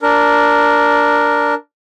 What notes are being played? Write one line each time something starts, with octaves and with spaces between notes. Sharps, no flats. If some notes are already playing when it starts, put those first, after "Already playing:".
D4 A#4